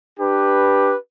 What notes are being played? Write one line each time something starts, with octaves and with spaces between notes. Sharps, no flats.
D4 G4 B4